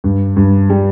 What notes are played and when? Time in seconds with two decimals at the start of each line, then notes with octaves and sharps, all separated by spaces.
0.04 G2
0.36 G2
0.70 G3